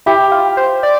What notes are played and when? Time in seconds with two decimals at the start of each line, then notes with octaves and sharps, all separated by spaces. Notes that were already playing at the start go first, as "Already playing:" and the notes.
0.06 E4 G4
0.31 F4
0.57 C5
0.83 D5